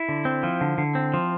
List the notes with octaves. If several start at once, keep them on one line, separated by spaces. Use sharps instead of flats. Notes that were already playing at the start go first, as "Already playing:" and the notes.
Already playing: E4
D3
C4
F3
D3
D3
C4
F3